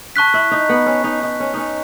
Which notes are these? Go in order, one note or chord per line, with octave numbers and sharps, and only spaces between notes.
A5 C#6 F#6 B6
E4
D#4
B3
C#4
D#4
D#4
C#4
C#4 D#4